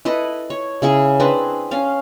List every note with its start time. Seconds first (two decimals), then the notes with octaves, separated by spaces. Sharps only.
0.05 E4 A4 B4 D#5
0.50 C#5
0.82 C#3 E4 G#4 C#6
1.20 C4 D4 G#4 B4
1.71 C#4 F5